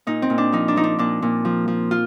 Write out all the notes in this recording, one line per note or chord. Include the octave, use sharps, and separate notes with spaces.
A#2 D#4
C4
A#2
D4
F3 D#4
D4
F3 D#4
D4
A#2 D4
A#2
F3
F3
F4